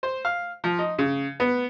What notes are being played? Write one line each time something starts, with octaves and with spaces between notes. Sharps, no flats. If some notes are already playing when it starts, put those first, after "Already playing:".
C5
F5
F3
D#4
C#3
B3